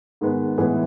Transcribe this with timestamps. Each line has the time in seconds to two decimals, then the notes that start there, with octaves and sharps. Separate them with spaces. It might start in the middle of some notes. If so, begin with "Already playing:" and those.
0.21 G#2 D#3 G#3 B3
0.58 A2 E3 G#3 B3 G#4